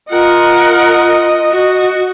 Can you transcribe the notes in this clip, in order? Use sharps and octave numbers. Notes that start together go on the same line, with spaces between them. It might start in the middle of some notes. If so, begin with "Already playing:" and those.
F4 A#4 D#5 F#5
F#4